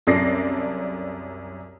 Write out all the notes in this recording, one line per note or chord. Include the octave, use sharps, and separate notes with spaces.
C2 F#2 A4 D5 A#6 C7